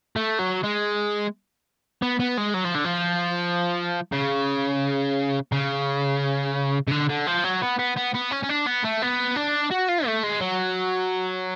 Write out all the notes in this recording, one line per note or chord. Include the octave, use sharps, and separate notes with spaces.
A3
F#3
G#3
B3
B3
G#3
F#3
F3
D3
F3
C#3
C#3
C#3
D3
D3
F3
F#3
B3
B3
B3
B3
C#4
C#4
D4
B3
A3
B3
D4
F#4
F4
A3
G#3
F#3